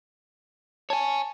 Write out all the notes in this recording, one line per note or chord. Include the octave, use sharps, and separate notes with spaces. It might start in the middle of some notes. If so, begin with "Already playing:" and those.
C#5 G#5 A5